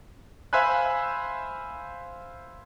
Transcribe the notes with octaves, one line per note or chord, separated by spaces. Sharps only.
C5 E5 F5 G#5 B5 F#6